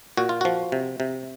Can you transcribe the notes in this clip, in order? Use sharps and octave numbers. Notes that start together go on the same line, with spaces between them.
A#2 F#4
F4
F3 F#4
C3
C3